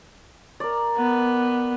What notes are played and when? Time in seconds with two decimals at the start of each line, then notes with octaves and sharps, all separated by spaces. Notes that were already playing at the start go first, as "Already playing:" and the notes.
0.60 A#4 D5
0.97 B3